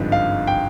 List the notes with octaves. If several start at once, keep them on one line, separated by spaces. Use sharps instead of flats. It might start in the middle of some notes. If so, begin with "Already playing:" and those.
Already playing: G#1 G2 D3 F3 G#3
F5
G5